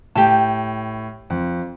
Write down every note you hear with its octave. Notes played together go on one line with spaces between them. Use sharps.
A2 G4 A5
F2